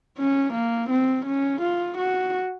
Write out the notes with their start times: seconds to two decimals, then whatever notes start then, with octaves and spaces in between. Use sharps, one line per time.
0.18 C#4
0.53 A#3
0.90 C4
1.26 C#4
1.62 F4
1.98 F#4